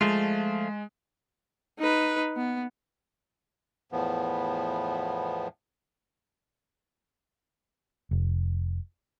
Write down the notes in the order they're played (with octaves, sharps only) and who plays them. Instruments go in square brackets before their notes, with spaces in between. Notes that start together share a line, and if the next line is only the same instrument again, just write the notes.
[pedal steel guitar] F3 A3 F4 [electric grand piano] G#3
[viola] D#4 B4
B3
[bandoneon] E2 A2 F3 B3
[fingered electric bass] F1